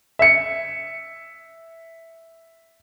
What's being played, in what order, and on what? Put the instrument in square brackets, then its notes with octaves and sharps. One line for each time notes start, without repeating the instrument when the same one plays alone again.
[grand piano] E5 C#7